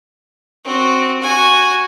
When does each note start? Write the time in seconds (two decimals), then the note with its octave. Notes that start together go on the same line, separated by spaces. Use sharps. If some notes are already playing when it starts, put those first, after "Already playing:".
0.65 C4 F#4
1.20 F#4 G#5